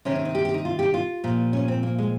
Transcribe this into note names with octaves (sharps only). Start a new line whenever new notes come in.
C3 D#3 C#4
C#4
D#4
G4
G4
D#4
F4
G4
F4
A#2 F3
C#4
C4
A#3
G#3